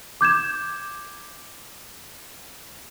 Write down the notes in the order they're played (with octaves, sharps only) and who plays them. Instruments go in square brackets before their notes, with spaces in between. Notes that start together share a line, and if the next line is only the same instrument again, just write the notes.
[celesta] D6 G6 G#6 E7